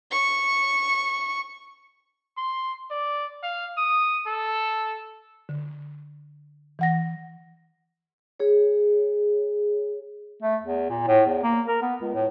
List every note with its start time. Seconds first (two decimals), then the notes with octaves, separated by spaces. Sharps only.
0.11 C#6
2.37 C6
2.91 D5
3.43 F5
3.78 D#6
4.27 A4
5.49 D3
6.79 E3 F#5 A#6
8.40 G#4 C#5
10.42 A3
10.63 E2
10.90 A#2
11.07 A2
11.26 E2
11.43 A#3
11.68 A#4
11.82 B3
12.01 C#2
12.14 A2